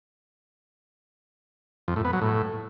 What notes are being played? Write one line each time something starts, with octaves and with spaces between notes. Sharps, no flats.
F2
A2
B3
F#3
A2